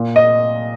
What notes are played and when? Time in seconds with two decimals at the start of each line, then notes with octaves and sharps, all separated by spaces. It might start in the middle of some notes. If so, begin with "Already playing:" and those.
Already playing: A#2
0.16 D#5